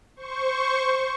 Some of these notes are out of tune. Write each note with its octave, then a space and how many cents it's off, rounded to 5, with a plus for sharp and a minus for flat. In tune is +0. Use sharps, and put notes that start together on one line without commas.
C5 +0 C#6 +0